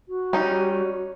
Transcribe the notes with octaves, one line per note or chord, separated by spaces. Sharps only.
F#4
G3 C#4 D#4